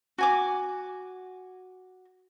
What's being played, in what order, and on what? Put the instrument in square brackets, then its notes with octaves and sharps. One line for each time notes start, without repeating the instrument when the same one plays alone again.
[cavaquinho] F#4 G#5 D6